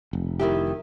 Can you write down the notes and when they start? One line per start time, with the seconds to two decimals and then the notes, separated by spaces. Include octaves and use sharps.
0.13 F1
0.39 D#3 E4 G4